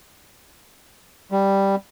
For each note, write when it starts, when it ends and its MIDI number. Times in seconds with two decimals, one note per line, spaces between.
1.31 1.75 55